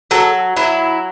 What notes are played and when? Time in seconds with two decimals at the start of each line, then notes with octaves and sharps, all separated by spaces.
0.11 F#3 A4
0.56 F#3 E4